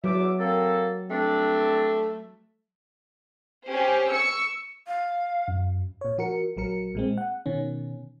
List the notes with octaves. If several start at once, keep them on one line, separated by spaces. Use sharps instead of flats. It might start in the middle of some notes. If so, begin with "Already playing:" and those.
E2 F#3 E5 D6
A#3 C4 A4
G2 A3 C4 D4
C#4 G4 C5
C#6 E6 C#7
F5
F#2
A#2 C#5
F3 F#4 A#4 C#7
A#1 F#3 A#4 C#7
A#2 G#3 C4
F#5
B2 D#3 C#4